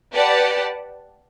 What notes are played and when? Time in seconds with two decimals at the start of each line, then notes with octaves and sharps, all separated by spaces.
0.12 G4 B4 D5 F#5 A5